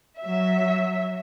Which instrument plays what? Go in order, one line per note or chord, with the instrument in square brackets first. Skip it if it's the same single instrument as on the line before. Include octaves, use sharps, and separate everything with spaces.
[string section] F#3 E5